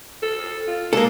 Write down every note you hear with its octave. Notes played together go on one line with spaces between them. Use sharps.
A4
F4
G#3 A#3 A4